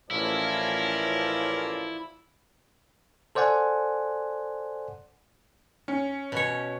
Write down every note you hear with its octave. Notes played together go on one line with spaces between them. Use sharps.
A1 F3 C#4 E4 F4 A#4 D5
A4 C5 D5 F#5 G#5
C#4
B2 C#5